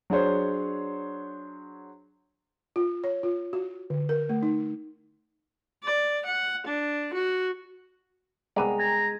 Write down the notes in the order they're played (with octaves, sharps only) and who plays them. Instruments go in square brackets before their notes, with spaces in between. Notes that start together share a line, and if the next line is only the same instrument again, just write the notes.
[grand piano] F#3 D4 G#4 C5 C#5
[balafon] F4
C#5
F4
F#4
D3
A#4
A3
D#4
[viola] D5
F#5
D4
F#4
[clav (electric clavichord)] C2 B3 D5 [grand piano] G#3 D#7 [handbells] G5 G#5 A#5
[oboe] A#5 [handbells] G#6